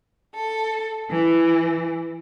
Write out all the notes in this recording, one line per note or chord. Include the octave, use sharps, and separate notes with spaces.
A4
E3